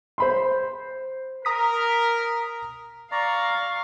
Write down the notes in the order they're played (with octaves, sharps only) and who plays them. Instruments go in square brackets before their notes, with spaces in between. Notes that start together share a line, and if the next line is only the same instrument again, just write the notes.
[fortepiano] C5 B5 C6
[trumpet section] A#4 [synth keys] A#5 D#6 B6
[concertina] D5 A#5 [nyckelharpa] F5 [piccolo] C#6